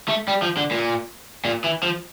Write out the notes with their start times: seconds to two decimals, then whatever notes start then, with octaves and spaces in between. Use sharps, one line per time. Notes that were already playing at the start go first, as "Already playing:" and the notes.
0.08 A3
0.28 G3
0.42 F3
0.57 D3
0.71 A#2
1.45 A#2
1.64 E3
1.83 F3